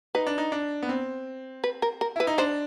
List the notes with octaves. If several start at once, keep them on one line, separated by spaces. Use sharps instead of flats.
D#4 B4
D4
D#4
D4
B3
C4
B4
A#4
A#4
E4 B4
D#4
D4 C5